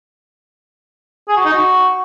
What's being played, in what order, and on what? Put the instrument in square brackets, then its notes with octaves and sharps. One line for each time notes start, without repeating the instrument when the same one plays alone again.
[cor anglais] G#4
F#4
D#4
F#4